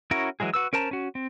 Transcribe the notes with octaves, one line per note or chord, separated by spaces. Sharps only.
C#4 E4 F#4 A#4 C#5
E3 F#3 G#3 G#4
F#4 B4 E6
C#4 A#4 C5 A5 A#5
C#4 F#4
C4